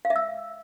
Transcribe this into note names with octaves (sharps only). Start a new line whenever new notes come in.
F5
E5
E6